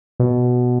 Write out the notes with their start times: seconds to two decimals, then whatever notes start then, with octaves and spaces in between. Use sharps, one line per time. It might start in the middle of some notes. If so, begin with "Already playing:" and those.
0.20 B2